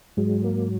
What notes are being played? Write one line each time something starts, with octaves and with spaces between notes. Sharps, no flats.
G#2 F#3 G#3
A#3